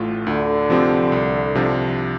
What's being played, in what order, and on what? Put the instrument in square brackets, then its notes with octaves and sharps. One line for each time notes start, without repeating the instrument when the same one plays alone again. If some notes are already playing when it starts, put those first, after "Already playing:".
Already playing: [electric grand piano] A1 A2 A3 F4
[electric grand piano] D2 [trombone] D3
[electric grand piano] C3 F3 C4 G4
C2
C3 F3 D4